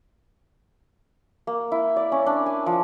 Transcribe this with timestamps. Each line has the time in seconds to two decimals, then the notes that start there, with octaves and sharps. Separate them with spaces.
1.47 A#3
1.72 E4
1.96 D5
2.12 C#4
2.26 D4
2.46 G#5
2.66 F3